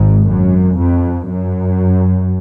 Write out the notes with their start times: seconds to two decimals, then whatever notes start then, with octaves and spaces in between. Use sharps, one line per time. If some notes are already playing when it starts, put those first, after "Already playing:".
Already playing: G#1 G#2
0.28 F#2
0.79 F2
1.29 F#2